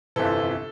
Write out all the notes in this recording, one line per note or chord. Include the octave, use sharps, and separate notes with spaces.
G1 F2 C3 E3 A4